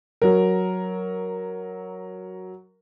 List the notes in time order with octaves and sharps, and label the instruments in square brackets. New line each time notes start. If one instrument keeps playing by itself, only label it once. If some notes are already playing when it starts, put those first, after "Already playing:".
[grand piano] F#3 A#4